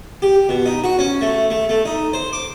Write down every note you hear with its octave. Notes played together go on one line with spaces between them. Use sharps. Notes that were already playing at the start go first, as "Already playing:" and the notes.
G4
B2
D#4
F#4
C#4
A3
A3
A3
D#4
C5
D6